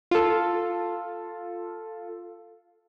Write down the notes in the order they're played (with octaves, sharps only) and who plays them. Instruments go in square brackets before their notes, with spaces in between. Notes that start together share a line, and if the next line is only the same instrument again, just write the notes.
[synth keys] F4 A4